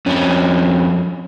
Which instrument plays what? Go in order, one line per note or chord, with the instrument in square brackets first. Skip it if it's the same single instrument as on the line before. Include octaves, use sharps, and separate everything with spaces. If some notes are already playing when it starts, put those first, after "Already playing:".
[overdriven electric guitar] F2 C#4